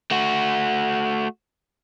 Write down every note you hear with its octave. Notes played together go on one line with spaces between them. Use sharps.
A3 F#4